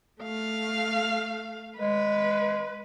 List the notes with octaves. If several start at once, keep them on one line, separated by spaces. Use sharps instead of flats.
A3 F5
G#3 B4